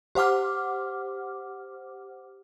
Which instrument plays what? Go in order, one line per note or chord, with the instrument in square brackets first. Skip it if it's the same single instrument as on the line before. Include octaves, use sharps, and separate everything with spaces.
[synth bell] G4 C5 F#5 D6 F6